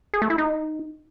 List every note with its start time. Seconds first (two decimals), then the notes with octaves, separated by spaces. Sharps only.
0.14 G#4
0.22 A3
0.30 E4
0.38 D#4